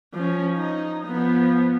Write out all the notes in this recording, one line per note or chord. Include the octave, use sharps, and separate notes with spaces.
F3 C#4
D#4
F3 B3